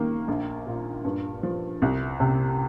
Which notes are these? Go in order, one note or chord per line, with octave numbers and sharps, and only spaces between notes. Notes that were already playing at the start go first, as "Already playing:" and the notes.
Already playing: D#3 A#3
A#1
A#2
G2
F3
C2
C3